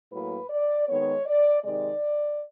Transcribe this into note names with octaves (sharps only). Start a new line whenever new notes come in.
A2 F#3 A#3 B4
D5
D#3 G#3 B3 C#5
D5
C3 D#3 G#3 D5